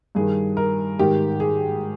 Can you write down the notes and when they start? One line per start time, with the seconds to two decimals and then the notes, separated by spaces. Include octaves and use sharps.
0.15 G2 D#3 G#4
0.57 A#4
0.99 G#2 D#3 G4
1.40 G#4